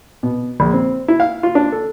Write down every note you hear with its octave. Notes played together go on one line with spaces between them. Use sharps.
B2
A#1
C4
E4
F5
F4
D4
A4